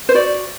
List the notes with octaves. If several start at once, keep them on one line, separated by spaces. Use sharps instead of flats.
C5
F#4 D5